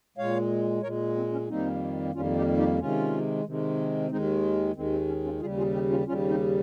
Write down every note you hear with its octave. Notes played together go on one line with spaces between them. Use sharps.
A#2 G#3 C#5 F5
A#2 G#3 A#4 C#5
C4
C#4
F2 D#3 G3 A#3 C4 D#4
F2 D#3 G3 A#3 C#4 F4
D#4 G4
D#4 G4
C3 D#3 G#3 C#4 F4
C3 D#3 G#3
D#2 D#3 G#3 C4 D#4
D#2 D#3 G#3 C4
C4
C#4
C#4 F4
D#2 C#3 G3 F4 G#4
F4 G#4
D#4 G4
C#4 F4
D#2 C#3 G3 C#4 F4
C4 D#4